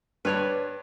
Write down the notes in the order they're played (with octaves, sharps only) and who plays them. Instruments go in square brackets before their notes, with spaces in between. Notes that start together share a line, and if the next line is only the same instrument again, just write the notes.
[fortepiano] G2 [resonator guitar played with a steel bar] B4 C#5 D5